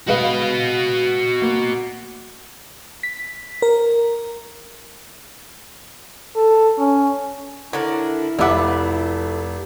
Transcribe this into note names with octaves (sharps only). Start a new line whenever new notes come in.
G#3 F#4 B4 D#5 F5
A#3
B6
A#4
A4
C#4
D3 D4 E4 A#4 C#5
F1 A3 F4 B4 E5 F#5 D6